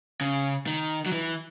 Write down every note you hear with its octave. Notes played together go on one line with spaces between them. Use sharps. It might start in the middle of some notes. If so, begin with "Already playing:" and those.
C#3
D#3
F#3
E3